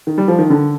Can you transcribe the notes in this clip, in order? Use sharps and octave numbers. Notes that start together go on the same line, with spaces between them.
D#3
G3
F3
D#3
D3